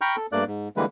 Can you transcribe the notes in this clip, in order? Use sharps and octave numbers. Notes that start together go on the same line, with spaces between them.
G5 A#5 B5 C#6 F6 G6
A4
G2 A3 A#3 D5 F#6
G#2
D3 E3 G3 G#3 A#3 B4